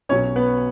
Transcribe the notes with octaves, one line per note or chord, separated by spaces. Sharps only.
B1 B2 F#3 C#4 C#5
B3 B4